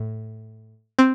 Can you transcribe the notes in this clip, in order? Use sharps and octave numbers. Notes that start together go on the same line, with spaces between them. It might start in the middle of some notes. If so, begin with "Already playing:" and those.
Already playing: A2
C4